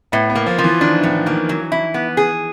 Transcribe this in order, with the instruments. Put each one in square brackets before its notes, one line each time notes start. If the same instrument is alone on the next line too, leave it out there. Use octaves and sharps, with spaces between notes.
[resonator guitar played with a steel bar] A2 [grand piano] B3
[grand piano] B3
[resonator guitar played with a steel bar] A#3
[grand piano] F3
[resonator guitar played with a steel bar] F3
[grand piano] E3
[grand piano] D#3 [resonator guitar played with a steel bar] D4
[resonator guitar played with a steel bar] A2 [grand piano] E3
[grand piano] D#3 [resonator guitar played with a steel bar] A#3
[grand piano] E3 [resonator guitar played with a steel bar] F#3
[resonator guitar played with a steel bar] E4
B3
G#4